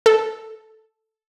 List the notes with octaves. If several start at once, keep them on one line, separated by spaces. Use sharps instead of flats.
A4